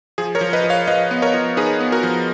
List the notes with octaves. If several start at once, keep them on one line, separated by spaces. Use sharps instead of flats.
F3 G#4
A#4 C#5
F3
B4 D#5
F3
C#5 F5
F3 B4 D#5
B3
A#4 C#5
F3
D#4 G#4 B4
B3
F#4 A#4
F3